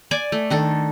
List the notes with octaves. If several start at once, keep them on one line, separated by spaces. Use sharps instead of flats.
D5 G#5 D6
A3
D#3 D4 A4